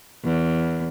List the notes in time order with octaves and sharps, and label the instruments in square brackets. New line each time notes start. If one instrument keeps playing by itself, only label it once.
[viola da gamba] E2